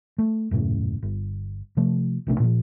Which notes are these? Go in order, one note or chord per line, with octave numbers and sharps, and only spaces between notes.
A3
D#1 F#2 A2 C#3
G1
C3 F3 A3
A#1 C3 A3 D4
A#2 F3